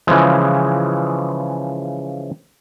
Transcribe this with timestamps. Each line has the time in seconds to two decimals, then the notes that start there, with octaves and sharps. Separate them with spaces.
0.07 C#3 E3 F3 G#3